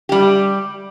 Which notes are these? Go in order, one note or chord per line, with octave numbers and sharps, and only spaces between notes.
G3 G4